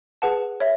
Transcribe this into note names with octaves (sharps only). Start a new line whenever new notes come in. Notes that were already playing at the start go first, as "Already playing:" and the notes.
G#4 B4 F#5 A5
C#5 E5